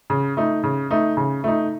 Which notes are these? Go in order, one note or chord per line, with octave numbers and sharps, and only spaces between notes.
C#3
A3 D#4
C#3
A3 D#4
C#3
A3 D#4